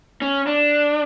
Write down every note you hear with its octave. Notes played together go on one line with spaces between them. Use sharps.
C#4
D4